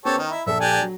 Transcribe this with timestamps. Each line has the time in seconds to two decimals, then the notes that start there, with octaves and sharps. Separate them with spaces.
0.05 B3 C#4 G4 A4 C5 C#5
0.18 D#3 D#5 A#5
0.31 E4
0.46 A#1 A4 E5 A5
0.61 D4 G4 G#5
0.81 F#3